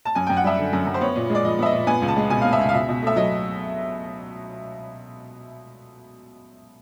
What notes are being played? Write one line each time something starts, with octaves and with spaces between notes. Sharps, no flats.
A5
F#2 G#5
F#2 G5
F#5
G3 E5
D3
F#2
F#2
C5
B3 C#5
A#2
G#3 D5
F3 D#5
B3 E5
D#5
A#2
B3 G#5
C#2
A5
G#3
B2 G#5
B3 F5
E5
C#2
F5
B2 E5
B2
A3 E5
F#3 D#5